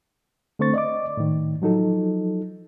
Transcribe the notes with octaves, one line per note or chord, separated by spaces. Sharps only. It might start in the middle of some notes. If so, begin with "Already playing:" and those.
D3 A3 C4 C5 C#6 A6
D5 D#5 D6
A2 D#3
F3 F#3 D#4 A4